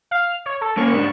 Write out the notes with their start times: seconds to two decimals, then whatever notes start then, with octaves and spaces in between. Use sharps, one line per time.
0.11 F5
0.46 C#5
0.61 A4
0.77 A#3 C#4 C#6
0.93 G#2 D4